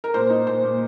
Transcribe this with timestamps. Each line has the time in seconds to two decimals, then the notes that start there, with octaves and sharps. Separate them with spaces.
0.04 A#4
0.14 A#2 C5
0.30 D#4
0.47 A#2 C5
0.63 A#2